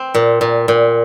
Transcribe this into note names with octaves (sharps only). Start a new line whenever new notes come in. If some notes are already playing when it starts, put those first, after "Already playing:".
Already playing: C4
A#2
A#2
A#2